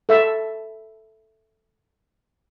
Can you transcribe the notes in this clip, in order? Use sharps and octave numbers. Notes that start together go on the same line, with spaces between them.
A4 E5